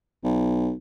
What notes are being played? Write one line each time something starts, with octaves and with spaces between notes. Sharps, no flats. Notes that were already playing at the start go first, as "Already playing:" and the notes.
B1